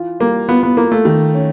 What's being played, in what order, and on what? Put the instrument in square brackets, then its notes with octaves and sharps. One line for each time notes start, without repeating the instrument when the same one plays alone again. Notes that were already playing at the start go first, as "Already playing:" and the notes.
Already playing: [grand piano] E3 F4
[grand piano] G3 [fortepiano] A#3
[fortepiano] B3 [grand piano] F4
[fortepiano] B3
[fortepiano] A#3 [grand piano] F4
[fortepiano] A3
[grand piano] D#3
C#4